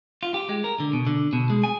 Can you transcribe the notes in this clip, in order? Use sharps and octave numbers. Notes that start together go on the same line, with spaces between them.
F4
G4
G#3
A#4
D3
B2
D3
B2
G#3
G#5